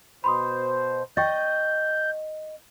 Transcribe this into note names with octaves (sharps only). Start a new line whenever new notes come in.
B2 C5 B5 C6 D#6
D#5 G5 C#6 G6 A6